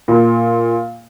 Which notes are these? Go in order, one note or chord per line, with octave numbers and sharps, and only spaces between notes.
A#2